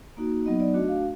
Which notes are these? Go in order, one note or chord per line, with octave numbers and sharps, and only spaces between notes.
A#3 D#4 F#4
F#3 B3 D#4 D#5
D5
A3 D4 F#4 D#5
F5